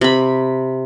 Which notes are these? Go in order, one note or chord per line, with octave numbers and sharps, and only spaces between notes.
C3 B5